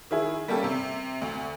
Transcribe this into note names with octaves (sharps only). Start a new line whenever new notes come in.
D#3 E4 G#4
G3 A#3 C#4 G4 A4
C3
D2